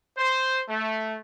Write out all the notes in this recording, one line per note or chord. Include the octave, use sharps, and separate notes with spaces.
C5
A3